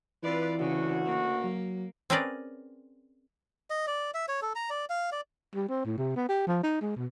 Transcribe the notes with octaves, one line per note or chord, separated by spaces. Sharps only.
E3 C4 F4 B4 D5
D2 C#3 F#4
A#3
F#3
C4 C#4 G#4 A#4 B4 D5
D#5
D5
E5
C#5
A4
A#5
D5
F5
D5
G3
C4
A2
C3
B3
G4
F3
D#4
G#3
B2